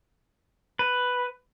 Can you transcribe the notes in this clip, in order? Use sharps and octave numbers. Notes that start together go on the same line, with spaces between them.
B4